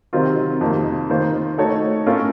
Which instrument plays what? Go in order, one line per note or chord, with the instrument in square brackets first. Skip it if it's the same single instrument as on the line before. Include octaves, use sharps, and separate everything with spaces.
[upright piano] C3 D#3 F#3 C4 F4
F2 C3 D#3 A#3
D#3 A#3 F4 C5
A3 D#4 F#4 A4 C#5
A2 A3 C#4 F4 A#4